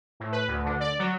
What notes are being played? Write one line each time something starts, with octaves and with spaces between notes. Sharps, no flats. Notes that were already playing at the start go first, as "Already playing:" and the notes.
A2
B4
D2
D3
D5
F#3